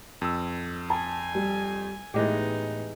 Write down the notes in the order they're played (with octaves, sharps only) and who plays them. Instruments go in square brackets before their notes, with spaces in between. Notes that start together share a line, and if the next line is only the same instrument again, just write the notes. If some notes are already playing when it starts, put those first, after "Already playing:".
[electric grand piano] F2 E6
[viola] G#5 [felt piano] A5
[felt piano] G3
[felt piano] A2 [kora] E3 G#3 G4 [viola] B3 D#4